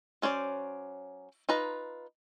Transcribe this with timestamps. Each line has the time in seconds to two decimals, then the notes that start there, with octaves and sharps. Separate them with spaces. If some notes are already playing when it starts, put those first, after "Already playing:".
0.22 F#3 C#4 C5 D5
1.49 D#4 F4 B4 A#5